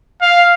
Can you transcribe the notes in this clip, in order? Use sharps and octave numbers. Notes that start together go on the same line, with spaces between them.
F5